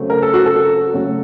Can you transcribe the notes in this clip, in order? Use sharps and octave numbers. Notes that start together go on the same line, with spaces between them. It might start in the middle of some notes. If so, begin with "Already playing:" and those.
Already playing: C#3 F#3 A3 C4
A#4
A4
F#4
A4
C#3 F#3 A3